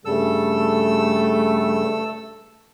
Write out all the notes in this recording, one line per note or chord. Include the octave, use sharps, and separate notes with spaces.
G2 C#3 G3 A3 A4 E6